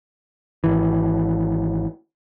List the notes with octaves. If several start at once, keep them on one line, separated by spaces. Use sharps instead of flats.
G#1 E3